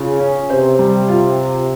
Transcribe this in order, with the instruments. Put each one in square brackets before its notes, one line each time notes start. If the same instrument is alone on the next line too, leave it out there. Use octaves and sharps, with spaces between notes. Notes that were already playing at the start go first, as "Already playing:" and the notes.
Already playing: [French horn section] C#3 [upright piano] F4
[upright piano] C#4
[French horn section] C3 [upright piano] C5
[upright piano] G3
F4